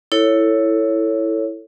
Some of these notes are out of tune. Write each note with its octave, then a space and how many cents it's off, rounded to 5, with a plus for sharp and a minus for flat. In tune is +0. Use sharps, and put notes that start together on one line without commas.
E4 +0 A4 +15 C#5 +0